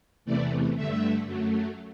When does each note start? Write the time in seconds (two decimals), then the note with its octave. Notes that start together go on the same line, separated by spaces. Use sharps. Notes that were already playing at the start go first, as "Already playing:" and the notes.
0.25 E2 C3 E3 A3 D5
0.75 G2 D3 A3 E5
1.25 F#2 F#3 A3